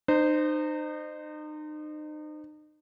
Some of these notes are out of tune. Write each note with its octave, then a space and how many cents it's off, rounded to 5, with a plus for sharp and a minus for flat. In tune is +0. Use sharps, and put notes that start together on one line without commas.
D#4 -35 C5 -15